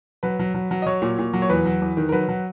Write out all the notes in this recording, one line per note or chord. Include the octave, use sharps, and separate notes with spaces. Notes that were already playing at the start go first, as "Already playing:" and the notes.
F#3 B4
F#3
F#3
F#3
D#5
F#3 C#5
A#2
A#2
F#3
C#5
E2 B4
F#3
E2
D#3
A#4
F#3 B4
F#3